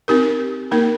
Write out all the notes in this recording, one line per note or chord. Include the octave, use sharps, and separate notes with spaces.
C4 D#4 G4 A#4
A#3 D#4 A#4